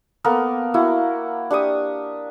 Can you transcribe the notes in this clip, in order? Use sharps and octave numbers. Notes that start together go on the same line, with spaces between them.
A#3 B3 A4 A#4
A#3 E4 F#4
D4 G4 C#6 D#6